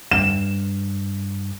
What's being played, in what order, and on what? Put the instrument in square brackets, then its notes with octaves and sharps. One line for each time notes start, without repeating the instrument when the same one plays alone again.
[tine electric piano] G2 [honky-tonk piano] E7